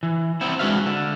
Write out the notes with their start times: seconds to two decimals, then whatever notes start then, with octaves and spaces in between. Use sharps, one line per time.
0.03 E3
0.41 B3 C4 E4
0.59 G#3 D4 F#4 B4 E5 F5
0.86 D3